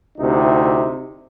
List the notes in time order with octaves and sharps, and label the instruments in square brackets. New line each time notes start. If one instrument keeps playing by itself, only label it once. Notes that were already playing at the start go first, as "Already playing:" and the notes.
[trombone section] D2 C3 D#4 E4 G4